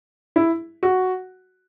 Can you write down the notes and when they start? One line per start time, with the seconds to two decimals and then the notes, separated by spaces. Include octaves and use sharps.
0.36 E4
0.83 F#4